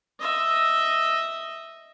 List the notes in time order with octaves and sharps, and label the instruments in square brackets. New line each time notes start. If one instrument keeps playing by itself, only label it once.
[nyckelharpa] D#5 E5